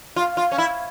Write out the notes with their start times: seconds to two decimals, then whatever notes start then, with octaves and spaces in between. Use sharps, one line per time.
0.16 F4
0.37 F4
0.52 C#4
0.58 E4